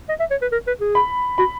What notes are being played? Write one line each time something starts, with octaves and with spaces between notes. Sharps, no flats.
D#5
E5
C#5
B4
A#4
B4
G#4
B5
F#4 B5